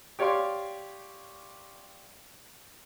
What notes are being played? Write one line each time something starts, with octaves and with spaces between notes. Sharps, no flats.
G4 C#5 D5 F5 C6